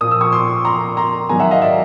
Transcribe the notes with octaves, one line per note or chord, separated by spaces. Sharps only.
A#2 F3 D#6
E6
C#6 D#6
C6 D6
A#5 C6
A#5 C6
G#2 D#3 F#3 G#5 A#5
E5 F#5
D#5 F5
D5 E5